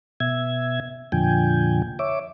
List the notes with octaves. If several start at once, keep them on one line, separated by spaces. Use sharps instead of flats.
B2 E5 G#6
F2 A#2 D3 F3 G5 G#5
C#5 E5 D6